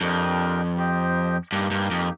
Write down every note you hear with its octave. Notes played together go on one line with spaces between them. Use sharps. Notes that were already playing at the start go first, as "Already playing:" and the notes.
F2 D4 G4 A#4 D#5 G5
G4 C5 D#5 G5
G2 A#3 D#4 G4
G2
F2